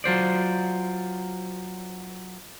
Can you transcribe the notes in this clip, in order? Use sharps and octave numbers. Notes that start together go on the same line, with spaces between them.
F#3 F4 C5 D5